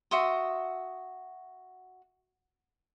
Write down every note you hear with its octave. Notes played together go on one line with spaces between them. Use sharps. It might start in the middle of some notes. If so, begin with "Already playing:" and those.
F#4 E5 C6 D#6